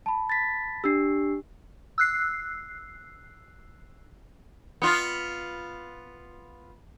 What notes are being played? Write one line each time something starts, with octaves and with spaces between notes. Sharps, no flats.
A5 B5
A6 B6
D4 G4 E6 C7
E6 F#6 C7
B3 F4